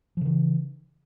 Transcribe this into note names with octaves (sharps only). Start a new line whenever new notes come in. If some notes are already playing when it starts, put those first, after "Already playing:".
C#3 E3 F3